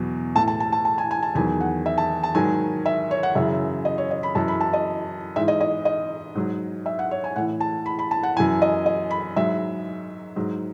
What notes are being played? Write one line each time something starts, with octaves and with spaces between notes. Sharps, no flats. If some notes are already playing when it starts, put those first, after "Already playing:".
Already playing: E2 B2 F#3
A2 E3 A5
A5
A5
A5
A5
G#5
G#5
A5
E2 D#3 F#3 G#5
F#5
E5
A5
A5
G#2 D#3 F#3 G#5
E5
C#5
F#5
F#2 C#3 E3 E5
D#5
C#5
D#5
B5
F#2 E3 A5
B5
A5
D#5
G#2 E3 E5
D#5
D#5
D#5
G#2 F#3
E5
F#5
C#5
G#5
A2 E3 F#5
A5
B5
B5
A5
F#5
F#2 E3 G#5
D#5
D#5
B5
G#2 F#3 E5
G#2 F#3